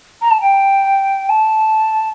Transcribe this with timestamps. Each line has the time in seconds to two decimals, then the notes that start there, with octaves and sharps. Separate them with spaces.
0.22 A#5
0.30 A5
0.40 G5
1.29 A5